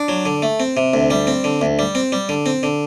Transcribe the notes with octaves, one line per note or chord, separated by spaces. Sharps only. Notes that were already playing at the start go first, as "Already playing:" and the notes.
Already playing: D4
F#3
D3
A3
C4
C3
D2
G3
C4
D3
D2
G3
C4
G3
D3
C4
D3